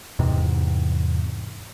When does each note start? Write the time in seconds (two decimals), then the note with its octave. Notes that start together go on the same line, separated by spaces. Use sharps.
0.19 E2 G#2 C3